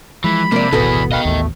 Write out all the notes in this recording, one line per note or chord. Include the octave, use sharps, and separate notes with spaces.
E3 F3 G#3 B5
C3 A#3 D5
D1 G#1 B2 E3 B3 F#4 G#4 A4
B4 D#5 F5 G5
A1 D#2 A3